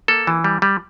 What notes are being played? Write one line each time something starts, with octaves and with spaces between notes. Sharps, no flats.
A#3 A4
E3
G3
G3